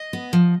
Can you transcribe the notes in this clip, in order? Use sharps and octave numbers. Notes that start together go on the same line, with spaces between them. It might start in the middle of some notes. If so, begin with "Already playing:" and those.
Already playing: D#5
B3
F3